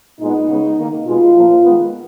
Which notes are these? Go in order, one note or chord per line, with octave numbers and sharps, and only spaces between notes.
A#2 G#3 B3 D#4
C#3 G#3 B3
D#3 A#3
B2 G#3 B3 F4
A#2 F3 A#3
D#3 G#3 B3